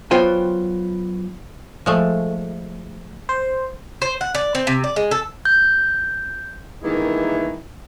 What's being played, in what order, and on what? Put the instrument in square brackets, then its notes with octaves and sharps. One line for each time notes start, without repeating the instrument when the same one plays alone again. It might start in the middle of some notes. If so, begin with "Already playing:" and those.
[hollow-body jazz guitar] F#3 B3 F4 C5 G5 G#5
[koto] F3 G#3 A3
[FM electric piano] C5
[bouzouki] C5
F#5
D5
C4
C3
D5
G#3
A4
[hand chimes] G6
[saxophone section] G2 D#3 E3 G#3 A#3 E4